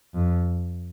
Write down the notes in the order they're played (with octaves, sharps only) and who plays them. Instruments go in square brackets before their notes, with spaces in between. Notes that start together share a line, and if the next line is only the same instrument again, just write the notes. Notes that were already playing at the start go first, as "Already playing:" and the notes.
[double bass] F2